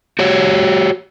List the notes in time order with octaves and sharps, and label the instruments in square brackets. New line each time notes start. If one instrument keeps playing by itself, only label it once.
[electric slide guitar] F#4 G4 C#5